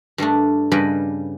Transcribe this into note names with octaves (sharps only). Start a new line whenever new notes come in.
G2 G3 A3 D4
G2 C#3 G3 B4 D#5 G5